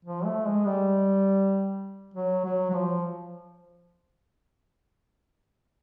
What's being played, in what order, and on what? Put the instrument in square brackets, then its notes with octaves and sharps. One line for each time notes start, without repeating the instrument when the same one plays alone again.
[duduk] F3
A3
G#3
G3
F#3
F#3
F#3
F3